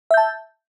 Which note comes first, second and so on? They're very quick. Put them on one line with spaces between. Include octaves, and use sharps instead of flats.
E5 G6 A5